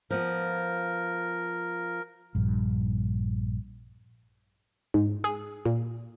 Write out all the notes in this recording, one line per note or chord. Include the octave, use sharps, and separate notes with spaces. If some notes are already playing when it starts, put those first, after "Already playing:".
F3 B3 A#4
A#1 G2
G#2
G#4
A#2